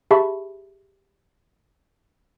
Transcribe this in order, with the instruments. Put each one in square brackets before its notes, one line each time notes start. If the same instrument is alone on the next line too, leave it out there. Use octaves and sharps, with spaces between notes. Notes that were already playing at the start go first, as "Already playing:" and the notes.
[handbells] G4 G#4 E5 A5 B5 C#6